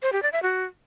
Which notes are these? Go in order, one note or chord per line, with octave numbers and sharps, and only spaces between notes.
C5
G4
D5
E5
F#4